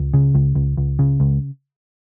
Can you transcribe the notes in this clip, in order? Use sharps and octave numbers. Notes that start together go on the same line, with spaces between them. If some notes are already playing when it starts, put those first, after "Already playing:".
Already playing: C#2
C#3
C#2
C#2
C#2
C#3
C#2